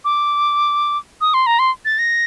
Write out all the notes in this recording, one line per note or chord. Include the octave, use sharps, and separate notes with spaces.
D6
D#6
C6
A#5
C6
A6
A#6